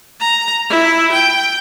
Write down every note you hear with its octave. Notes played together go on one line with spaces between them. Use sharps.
A#5
E4
G5